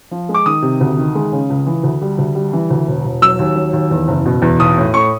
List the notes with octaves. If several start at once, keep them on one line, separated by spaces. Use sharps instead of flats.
F3
G#3
D6
D#3 D#6
C3
D2
D#3
G#3
C#3
C#2
E3
D2
G3
D2
G3
E3
D2
E1
E1
F#3 E6
D#2
F#3
D#2
E2
F#1
B2
E2
B1 D#6
A2
A2 C#6